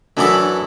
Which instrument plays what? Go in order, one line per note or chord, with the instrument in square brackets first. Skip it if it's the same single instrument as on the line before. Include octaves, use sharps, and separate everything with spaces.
[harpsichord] F#2 E3 B3 E4 A4 [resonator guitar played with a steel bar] D4